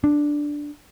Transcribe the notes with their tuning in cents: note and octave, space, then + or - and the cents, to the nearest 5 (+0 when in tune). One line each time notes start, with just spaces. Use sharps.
D4 +0